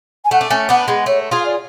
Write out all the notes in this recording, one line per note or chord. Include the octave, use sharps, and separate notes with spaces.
G#5
A3 F#5
D4
A3 C#4 G#5
B3 D4 F#5
G#3 B3
A3 C#5
F4 G#4
F5
D5